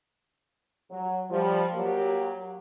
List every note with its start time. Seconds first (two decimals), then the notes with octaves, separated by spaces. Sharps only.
0.91 F#3
1.30 F3 G3
1.74 F#3 A#3 G4